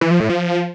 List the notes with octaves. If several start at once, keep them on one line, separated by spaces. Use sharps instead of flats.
E3
F3
A2
F3